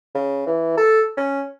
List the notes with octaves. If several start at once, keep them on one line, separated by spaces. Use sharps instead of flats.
C#3
E3
A4
C#4